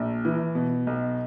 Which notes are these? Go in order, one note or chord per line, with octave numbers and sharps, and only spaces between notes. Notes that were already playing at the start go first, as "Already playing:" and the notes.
Already playing: A#1
E3
B2
B1